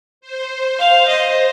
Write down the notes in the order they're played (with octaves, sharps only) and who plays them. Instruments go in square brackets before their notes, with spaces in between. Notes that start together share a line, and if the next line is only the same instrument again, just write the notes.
[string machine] C5
[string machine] C5 [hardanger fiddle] F5
[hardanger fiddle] D#5